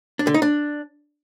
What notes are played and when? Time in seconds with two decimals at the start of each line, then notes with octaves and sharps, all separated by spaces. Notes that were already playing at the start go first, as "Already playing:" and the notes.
0.19 D4
0.27 D3
0.34 D#4
0.42 D4